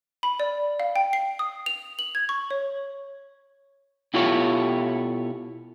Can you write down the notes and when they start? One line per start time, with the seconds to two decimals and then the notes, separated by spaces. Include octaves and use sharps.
0.23 B5
0.40 D5
0.80 F5
0.96 G5
1.13 C7
1.39 D#6
1.66 F7
1.99 F#7
2.15 G#6
2.29 C#6
2.51 C#5
4.14 B2 E4 F4 G4 A4 C#5